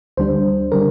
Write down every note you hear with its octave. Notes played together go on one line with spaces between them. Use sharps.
D2 D3 G3 D4 C5
D3 G3 D4 A#4